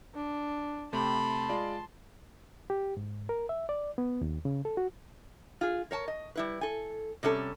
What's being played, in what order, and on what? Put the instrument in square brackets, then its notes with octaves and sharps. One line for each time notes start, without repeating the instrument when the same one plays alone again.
[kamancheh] D4
[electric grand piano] C3 A3 G4 [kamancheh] A5 C6 [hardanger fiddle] B5
[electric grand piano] G#3 F4 D5
[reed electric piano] G4
G#2
A#4
E5
D5
B3
D#2
C#3
A4
F#4
[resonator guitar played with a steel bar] F4 G#4
A#4 C#5 A5
D#5
G3 E4 B4
A4 G#5
C3 G3 C#4 A4